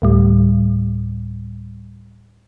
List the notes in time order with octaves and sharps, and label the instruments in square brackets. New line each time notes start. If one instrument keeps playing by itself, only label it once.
[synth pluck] D2 A2 G3